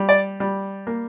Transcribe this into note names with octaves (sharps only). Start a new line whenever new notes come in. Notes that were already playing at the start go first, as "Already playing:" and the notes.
Already playing: G3
D5
G3
A#3